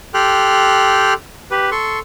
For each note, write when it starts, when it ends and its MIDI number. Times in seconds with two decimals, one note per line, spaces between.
0.14 1.14 67
0.14 1.14 69
0.14 1.14 79
0.14 1.14 84
0.14 1.14 89
0.14 1.14 90
1.51 1.70 67
1.51 1.70 71
1.72 1.99 69
1.72 1.99 84
1.72 1.99 85